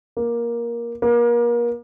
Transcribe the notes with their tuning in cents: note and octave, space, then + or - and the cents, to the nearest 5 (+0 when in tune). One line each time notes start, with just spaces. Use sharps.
A#3 +15
A#3 +35